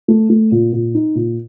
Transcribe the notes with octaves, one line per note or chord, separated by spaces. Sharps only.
A3
A3
A#2
A#2
D#4
A#2